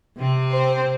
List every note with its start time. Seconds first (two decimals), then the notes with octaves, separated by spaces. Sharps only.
0.19 C3 C4
0.51 C5